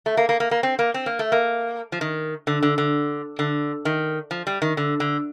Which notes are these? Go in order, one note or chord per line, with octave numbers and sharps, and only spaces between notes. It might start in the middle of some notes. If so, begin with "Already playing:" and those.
A3
A#3
A#3
A#3
A#3
C4
A#3
C4
A#3
A3
A#3
F3
D#3
D3
D3
D3
D3
D#3
F3
G3
D#3
D3
D3